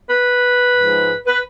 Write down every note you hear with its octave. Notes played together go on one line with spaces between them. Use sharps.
B4
G#2 F3 G#3
B4